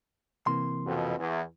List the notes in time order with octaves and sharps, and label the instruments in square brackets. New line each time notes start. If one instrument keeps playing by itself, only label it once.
[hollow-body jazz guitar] C3 E3 A#3 [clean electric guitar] C6
[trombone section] F2 B2
E2